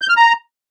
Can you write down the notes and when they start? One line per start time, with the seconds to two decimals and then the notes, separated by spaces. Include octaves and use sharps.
0.02 G6
0.09 F6
0.17 A#5